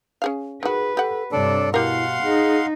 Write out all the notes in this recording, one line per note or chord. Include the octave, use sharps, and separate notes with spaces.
C#4 G#4 F5
D#3 F#4 G#4 B4
G4 A4 F#5
G2 C3 D4 A4 C#5 D5
B2 E4 G4 A#4 F5 F#5 C6
D#4 G#4